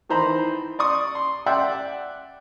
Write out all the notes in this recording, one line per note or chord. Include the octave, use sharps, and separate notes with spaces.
D#3 E3 C5 A#5 B5
D5 C6 C#6 D#6
C6
D5 E5 F#5 G5 C6